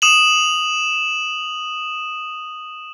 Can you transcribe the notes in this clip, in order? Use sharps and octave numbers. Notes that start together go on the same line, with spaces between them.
D#6 E7 F#7